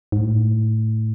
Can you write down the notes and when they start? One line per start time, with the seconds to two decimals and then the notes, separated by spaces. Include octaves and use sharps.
0.12 G#2
0.20 A2